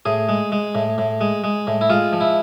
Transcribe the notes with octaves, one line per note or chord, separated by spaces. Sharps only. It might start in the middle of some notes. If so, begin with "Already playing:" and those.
A2 G#4
G#3
G#3
A2
A2
G#3
G#3
A2
E4
G#3 F4
F3
E4